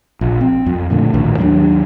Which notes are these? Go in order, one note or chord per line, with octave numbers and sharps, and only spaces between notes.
A#1
C4
F2
A#2 D3 A3
A#1 D#2 A2
D#2 F#3 A3 D4